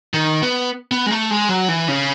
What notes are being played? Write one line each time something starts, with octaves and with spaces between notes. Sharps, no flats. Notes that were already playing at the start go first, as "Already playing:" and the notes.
D#3
B3
B3
G#3
A3
G#3
F#3
E3
C#3